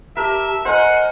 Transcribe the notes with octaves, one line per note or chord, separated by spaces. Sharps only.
G4 A#4 E5 A5
A#4 C5 D#5 F#5 G#5